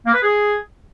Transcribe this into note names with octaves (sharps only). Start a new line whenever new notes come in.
A#3
B4
G#4